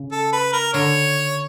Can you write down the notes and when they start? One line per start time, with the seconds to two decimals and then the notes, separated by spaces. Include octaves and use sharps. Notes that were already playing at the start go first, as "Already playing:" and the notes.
Already playing: C#3
0.12 A4
0.33 B4
0.52 A#4
0.73 D3 C#5